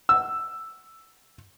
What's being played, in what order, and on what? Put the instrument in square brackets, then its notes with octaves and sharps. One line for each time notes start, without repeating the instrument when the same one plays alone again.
[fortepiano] E6